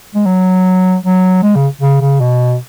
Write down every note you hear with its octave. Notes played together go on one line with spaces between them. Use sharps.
G#3
F#3
F#3
G#3
C#3
C#3
C#3
B2